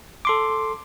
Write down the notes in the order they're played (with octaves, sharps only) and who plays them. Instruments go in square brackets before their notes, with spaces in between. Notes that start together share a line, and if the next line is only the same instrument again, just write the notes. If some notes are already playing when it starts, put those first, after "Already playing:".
[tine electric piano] A4 C6 D6